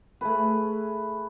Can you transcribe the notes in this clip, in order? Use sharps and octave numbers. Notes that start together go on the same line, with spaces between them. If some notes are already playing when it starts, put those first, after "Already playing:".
A3 G#4 B4